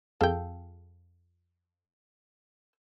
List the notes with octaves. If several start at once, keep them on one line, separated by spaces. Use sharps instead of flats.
F2 G#4 A4 F5 G5